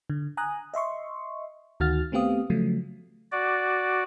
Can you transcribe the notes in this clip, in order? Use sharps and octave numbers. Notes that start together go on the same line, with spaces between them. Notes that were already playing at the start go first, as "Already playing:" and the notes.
D3
G#5 A#5 D#6 F#6
D#5 E5 C6 C#6
D2 D#3 F#4 F6 A6
A3 B3 C4 G4 F5 D#6
C#3 F3 F#3 A3
F#4 D5